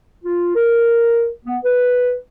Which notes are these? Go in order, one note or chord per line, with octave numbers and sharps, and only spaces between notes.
F4
A#4
B3
B4